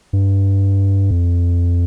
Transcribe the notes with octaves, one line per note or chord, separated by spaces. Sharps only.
G2
F2